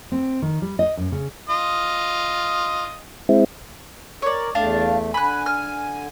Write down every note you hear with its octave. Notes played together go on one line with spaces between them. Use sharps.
C4
D#3
G3
D#5
F#2
C#3
F4 D#5
G#3 C4 E4
A#4 C#5 D5
E2 A3 D4 F5 A5
D3 G#5 B5 F#6
F6